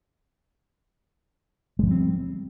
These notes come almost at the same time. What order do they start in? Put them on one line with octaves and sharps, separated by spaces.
G#3 F3 G3 C4